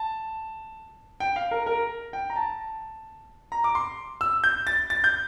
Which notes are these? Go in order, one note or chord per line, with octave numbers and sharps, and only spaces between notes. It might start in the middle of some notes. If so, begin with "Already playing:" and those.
Already playing: A5
G5
F5
A#4
A#4
G5
A#5
A5
A#5
D6
C6
E6
G6
A6
A6
G6